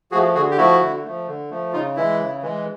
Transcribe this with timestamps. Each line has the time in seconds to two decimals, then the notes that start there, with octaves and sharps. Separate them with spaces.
0.11 F3 A3 F#4 G#4
0.35 D3 F#4 G#4
0.51 G4
0.57 F3 A3 E4 F#4
0.81 D3
1.04 F3 A3
1.27 D3
1.50 F3 A3
1.73 C#3 D#4 F4
1.96 E3 G#3 E4
2.19 C#3
2.42 E3 G#3